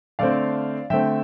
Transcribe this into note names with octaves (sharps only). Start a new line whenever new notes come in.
D3 A3 C4 D5 F5
D3 A3 C4 E5 G5